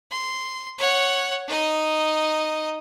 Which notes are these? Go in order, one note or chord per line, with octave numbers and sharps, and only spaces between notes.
C6
C#5 F#5
D#4 D#5